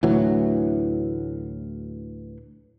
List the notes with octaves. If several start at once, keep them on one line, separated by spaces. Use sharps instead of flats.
D2 A2 E3 F#3